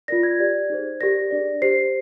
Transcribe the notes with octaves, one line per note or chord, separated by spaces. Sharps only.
F4 A#4 D5 A#6
G#6
G4 D5
D#4 G#4 C5
G4 A#4 D5 A#6
D4 G#4 D5
G4 C5 C7